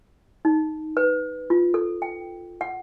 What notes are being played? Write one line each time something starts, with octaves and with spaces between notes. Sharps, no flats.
D#4
B4
F4
A4
G5
F#5